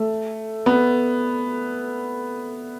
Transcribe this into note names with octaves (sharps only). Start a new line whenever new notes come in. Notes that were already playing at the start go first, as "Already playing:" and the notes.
Already playing: A3
B3